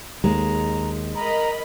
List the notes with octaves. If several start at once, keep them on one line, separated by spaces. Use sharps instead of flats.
D#2 G#3 A#5
A#4 D#5 A#5 B5